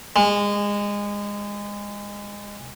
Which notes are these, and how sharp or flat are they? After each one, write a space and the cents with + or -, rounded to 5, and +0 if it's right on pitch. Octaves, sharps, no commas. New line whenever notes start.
G#3 -25